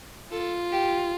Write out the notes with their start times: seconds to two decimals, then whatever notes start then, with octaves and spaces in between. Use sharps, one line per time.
0.32 F4 A4
0.72 G4